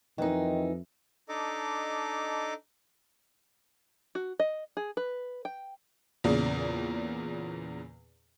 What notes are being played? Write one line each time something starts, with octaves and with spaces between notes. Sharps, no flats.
F2 D#3 E3 D#4
D4 D#4 A4 D#5 D6
F#4
D#5
G#4
B4
G5
E2 A#2 C#3